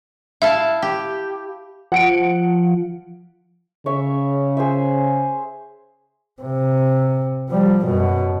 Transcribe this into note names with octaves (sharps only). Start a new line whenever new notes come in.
E4 E5 F5 A5
G4
F3 F#5 C#7 D7
C#3 C#5 E5
G#4 C5 E5
C3
F3 G3
F#2 B2